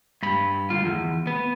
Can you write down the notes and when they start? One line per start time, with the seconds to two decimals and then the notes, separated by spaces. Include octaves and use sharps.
0.23 G2 B5
0.70 D2 F4
0.85 E2
1.27 B3